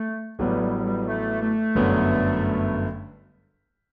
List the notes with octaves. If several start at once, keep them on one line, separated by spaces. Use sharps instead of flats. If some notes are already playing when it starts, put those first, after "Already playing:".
Already playing: A3
A1 A2 F#3 G3 B3
G3
G3
A3
A3
G1 F#2 D3 F#3 B3